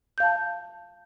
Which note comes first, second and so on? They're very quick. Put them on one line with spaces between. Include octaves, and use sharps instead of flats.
G6 F5 A5